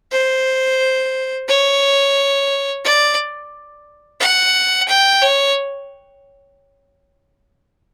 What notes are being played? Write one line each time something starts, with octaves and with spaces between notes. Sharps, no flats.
C5
C#5
D5
F#5
G5
C#5